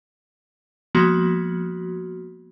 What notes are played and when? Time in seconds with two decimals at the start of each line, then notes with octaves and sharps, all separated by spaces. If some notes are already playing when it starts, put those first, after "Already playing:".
0.95 F3 G#3 A#3 B3 F#4